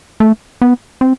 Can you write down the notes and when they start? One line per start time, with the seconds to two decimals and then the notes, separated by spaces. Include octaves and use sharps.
0.20 A3
0.62 B3
1.01 C4